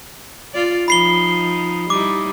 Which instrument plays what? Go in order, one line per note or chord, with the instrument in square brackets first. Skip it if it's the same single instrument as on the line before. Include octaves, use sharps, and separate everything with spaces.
[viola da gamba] F4 D5
[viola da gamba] F3 D#4 [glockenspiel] B5 C7 G7
[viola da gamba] G3 D#4 E4 [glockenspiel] D6